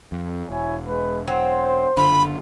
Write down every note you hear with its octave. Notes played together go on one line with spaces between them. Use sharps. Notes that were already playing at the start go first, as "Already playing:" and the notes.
F2
E1 E4 C#5 G#5
G#3 B4
F#3 C4 C5
F#1 D3 F4 B5